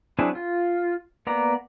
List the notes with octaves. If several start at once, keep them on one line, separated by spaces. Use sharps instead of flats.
F#3 C4 D4 E4 G#4
F4
A#3 B3 D5 A#5